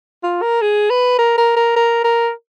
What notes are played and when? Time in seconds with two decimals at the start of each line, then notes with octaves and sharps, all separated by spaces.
0.23 F4
0.42 A#4
0.62 G#4
0.90 B4
1.18 A#4
1.38 A#4
1.56 A#4
1.76 A#4
2.04 A#4